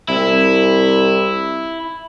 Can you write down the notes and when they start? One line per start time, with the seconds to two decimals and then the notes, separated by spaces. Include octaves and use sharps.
0.09 C2 E4